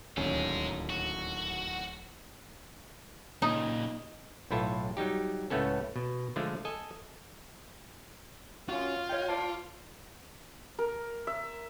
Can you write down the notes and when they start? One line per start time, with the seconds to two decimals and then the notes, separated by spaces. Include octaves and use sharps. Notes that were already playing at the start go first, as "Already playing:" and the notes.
0.17 D1 D#2 C#4 D#4 G#4
0.90 F#4
3.42 A#2 C#3 D#4
4.51 B1 A2 E4 F4 A4 A5
4.97 F#3 G3 D#4 G4
5.50 C#2 A2 A3 B3 C#4 A4
5.96 B2
6.36 D3 F3 G#3 A3
6.65 A4 D#5 G#5
8.69 C#4 F4 F#4
9.09 C#5 D#5 G5
9.28 C5 D5 A5
10.79 A#4
11.27 E5